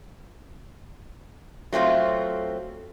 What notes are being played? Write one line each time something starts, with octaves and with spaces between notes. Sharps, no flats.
F#3 A3 C4 F4